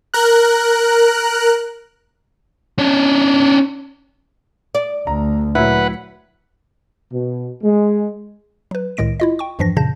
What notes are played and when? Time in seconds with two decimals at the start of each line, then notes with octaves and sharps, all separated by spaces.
0.14 A#4 F#6
2.78 C#4 D4
4.75 D5
5.07 D2 A#5
5.55 A#2 F#3 E4 B4 F#5
7.13 B2
7.63 G#3
8.71 F#3 B4
8.97 C2 A2 D#3 G#3 A#6 D7
9.20 E4 F4 D#5
9.39 G5 C#6
9.59 E2 G2 E3 F3 D4 A#6
9.76 F#2 A#2 C#3 A5 G6 A#6